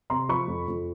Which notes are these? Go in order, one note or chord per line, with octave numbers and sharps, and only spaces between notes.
C3 A#5 C6
F3 B5 C#6
F2
F2